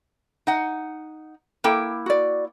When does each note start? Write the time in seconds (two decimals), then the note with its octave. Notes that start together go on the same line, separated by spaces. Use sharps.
0.47 D#4 F#5
1.64 A#3 E4 A4 G5
2.06 F#4 D5